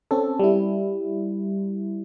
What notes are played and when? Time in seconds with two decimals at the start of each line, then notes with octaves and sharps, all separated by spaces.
0.11 C4 C#4 A4
0.39 G3 E4